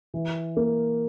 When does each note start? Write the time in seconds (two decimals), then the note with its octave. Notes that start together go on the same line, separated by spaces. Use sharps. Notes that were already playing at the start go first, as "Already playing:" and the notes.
0.14 E3
0.57 A#3